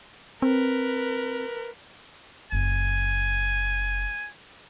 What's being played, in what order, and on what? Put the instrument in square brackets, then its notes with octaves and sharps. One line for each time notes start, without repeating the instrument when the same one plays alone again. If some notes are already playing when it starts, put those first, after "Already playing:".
[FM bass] C4 [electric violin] A#4 B4
[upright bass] F#1 [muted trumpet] G#5